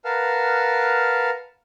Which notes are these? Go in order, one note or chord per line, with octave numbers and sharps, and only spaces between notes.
A#4 B4 F5 F#5 A5 F6